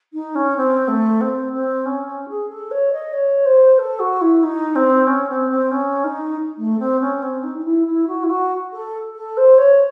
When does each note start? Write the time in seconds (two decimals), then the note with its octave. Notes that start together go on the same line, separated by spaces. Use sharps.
0.13 D#4
0.35 C#4
0.56 C4
0.87 A3
1.20 C4
1.52 C4
1.85 C#4
2.07 C#4
2.28 G#4
2.49 A4
2.71 C#5
2.92 D#5
3.13 C#5
3.45 C5
3.78 A4
3.99 F#4
4.21 E4
4.43 D#4
4.75 C4
5.06 C#4
5.29 C4
5.50 C4
5.71 C#4
6.04 D#4
6.57 A3
6.79 C4
7.00 C#4
7.22 C4
7.43 D#4
7.57 D#4
7.64 E4
7.86 E4
8.07 F#4
8.23 E4
8.29 F#4
8.72 A4
9.15 A4
9.37 C5
9.58 C#5